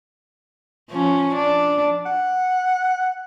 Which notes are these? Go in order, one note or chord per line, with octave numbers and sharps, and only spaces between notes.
F3 C#4
D4
F#5